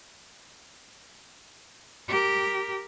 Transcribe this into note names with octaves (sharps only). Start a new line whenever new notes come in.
G4 A#4